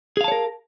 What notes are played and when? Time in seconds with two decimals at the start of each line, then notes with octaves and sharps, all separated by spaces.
0.17 G#4
0.21 F5
0.24 A5
0.28 C#5
0.32 A#4